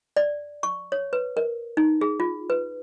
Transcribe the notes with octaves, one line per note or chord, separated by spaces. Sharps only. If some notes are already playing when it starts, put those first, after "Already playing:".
D5
C#6
C#5
B4
A#4
D#4
G#4
F4
B4